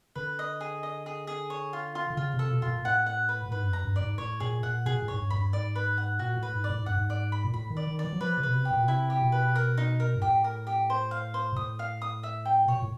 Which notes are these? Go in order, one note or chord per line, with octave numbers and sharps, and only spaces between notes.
D3 B4
D#5
G#4
D#5
G#4
G#4
C#5
F4
F4
D3
C#3 F4
C3
A4
B2
B2 F4
A#2
A#2
A2 F#5
F#5
B4
A2
G#2 B4
G2
F#2
A#5
G2
D5
G#2
A2 C#5
A#2 G#4
A#2 F#5
B2 G#4
A#2
A2
G#2 C#5
G2
F#2 B5
G2
G#2 D5
B4
F#5
A#2 F#4
A2
B4
G#2
D5
A2
G#2
G2 F#5
G#2
D5
B5
A#2
A2 B5
D#3
D5
D#3
D5
E3
F#3
F3 B4
C#3
B2 B4
C3
G4
A#2
B2
C3 E4
G4
B2
B4
A#4
D#4
A#4
G#2
A2 G4
A#4
G4
C5
F5
C5
A#2
A2 D#6
F5
D#6
E5
G5
B2 C#5
A#2
A2